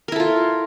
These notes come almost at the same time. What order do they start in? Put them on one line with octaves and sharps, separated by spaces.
A#4 E4 A4 F4